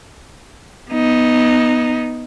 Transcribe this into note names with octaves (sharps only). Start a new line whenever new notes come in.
B3 D#4